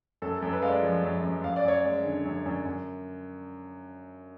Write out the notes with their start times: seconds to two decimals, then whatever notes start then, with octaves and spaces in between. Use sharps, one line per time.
0.22 F#2 A4
0.37 A4
0.42 F#2
0.53 B4
0.62 G#3 F5
0.68 D5
0.82 F3
1.03 F#2
1.24 F#2
1.44 F#2 F5
1.56 D5
1.65 F#2 C#5
1.80 G#3 D5
2.05 D3
2.25 F#2
2.46 F#2
2.66 F#2